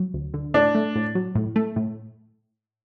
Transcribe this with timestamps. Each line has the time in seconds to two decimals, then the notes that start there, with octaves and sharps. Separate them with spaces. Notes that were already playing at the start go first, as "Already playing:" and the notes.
Already playing: F#3
0.14 D2
0.34 D3
0.54 A2 D4
0.75 A3
0.96 A2
1.15 F#3
1.35 A2
1.56 A3
1.76 A2